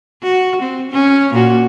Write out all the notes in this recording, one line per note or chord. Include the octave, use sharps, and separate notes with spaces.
F#4
C4
C#4
A#2 A#3 F#4